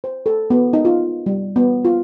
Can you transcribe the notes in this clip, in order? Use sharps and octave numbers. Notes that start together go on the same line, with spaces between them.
C5
A4
B3
D#4
F4
G3
B3
F4